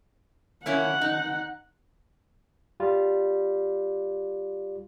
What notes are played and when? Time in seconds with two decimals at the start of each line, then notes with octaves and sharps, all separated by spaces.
0.66 A#3 C#4 E4 F#5
1.01 D#4
2.80 G3 F4